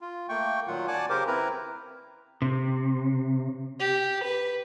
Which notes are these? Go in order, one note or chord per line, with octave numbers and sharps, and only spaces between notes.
F4
A3 A#3 G5 C#6
A#2 D#3 F#3 F4 F#5
D5 F#5 G#5 A5 D6 F#6
C#3 G4 A#4 C5 D6
C4 E4 A#4 B4 A#5
C3
G4
B4